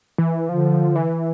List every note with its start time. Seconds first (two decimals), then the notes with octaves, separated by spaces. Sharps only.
0.18 E3
0.49 D3 F3
0.96 E3